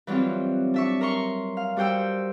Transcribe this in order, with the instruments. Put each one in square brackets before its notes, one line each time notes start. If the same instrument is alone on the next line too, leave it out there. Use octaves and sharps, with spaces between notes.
[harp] E3 F#3 G3 C4 F4
D4 E5 C#6
A#4 A#5 C6 C#6
F5
G3 F#4 C5 G5 E6